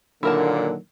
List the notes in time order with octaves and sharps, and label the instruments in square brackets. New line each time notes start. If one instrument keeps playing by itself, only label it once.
[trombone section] A#2 D3 [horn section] D#3 F#3 A#3 [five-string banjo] E4 A#4 A5